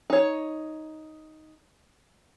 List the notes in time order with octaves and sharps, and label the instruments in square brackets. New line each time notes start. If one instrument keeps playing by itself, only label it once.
[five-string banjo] D#4 C#5